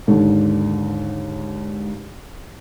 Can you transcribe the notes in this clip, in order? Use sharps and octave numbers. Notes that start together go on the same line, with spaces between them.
D#2 G#2 D3